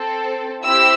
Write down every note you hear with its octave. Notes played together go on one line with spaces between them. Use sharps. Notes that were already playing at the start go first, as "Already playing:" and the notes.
Already playing: C4 A4
C4 E4 G4 E6